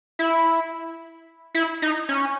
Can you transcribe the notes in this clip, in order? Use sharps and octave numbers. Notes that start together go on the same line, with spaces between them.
E4
E4
D#4
C#4